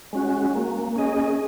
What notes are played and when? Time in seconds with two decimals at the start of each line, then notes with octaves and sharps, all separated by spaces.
0.13 G#3 C#4 F#4
0.55 A#3
0.96 C#4 G#4 D#5